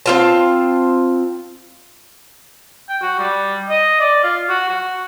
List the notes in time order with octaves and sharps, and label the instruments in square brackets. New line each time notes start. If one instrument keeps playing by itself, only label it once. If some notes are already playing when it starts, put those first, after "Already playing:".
[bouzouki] C4 F4 A5
[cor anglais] G5
F#4
G3
D#5
D5
F4
F#4
F#4